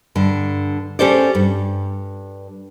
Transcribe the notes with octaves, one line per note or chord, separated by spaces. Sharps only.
G2 D3
C#4 G4 A4 C5 D5
G2